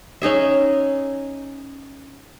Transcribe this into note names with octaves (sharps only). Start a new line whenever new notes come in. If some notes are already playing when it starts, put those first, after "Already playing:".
C#4 D#4 G#4 E5